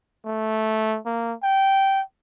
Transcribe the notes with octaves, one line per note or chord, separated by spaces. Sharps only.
A3
A#3
G5